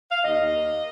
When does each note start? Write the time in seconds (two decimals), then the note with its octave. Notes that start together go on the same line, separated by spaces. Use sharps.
0.11 F5
0.24 D#2 D#5
0.39 D#2
0.54 A#3